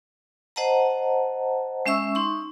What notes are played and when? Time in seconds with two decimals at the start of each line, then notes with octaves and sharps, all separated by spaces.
0.56 C5 D#5 F#5 A5 A#5
1.86 G#3 C#4 E5 C#6 E6
2.15 D#4 C6 C#6